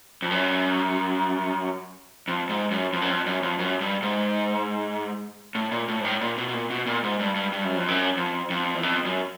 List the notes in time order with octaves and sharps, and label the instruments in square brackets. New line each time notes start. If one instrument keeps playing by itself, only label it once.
[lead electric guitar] F2
F#2
F2
G#2
F#2
F2
F#2
F2
F#2
F2
F#2
G2
G#2
A2
A#2
A2
G#2
A2
A#2
B2
B2
A#2
B2
A#2
G#2
G2
G2
G2
F#2
F2
F#2
F2
F2
E2
F2
F#2